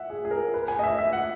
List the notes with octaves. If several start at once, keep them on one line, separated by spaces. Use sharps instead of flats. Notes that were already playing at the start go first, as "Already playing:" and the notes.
Already playing: E5 F#5
G#4
G#4
A#4
B4
G#5
D#5
E5
E5
F#5